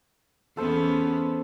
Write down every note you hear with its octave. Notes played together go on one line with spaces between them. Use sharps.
E2 B3 C#4 A4 C5